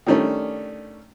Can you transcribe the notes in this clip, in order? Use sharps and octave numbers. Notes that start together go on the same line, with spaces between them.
D#3 G3 A3 C#4 D4